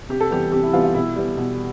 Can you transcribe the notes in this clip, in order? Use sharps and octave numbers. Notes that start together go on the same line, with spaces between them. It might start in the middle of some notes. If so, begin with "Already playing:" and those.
C3 G4
A4
E3 G3 B3 G4
C3 G4
E4
E3 G3 B3 F4
F4
B2 E4
G3 B3
B2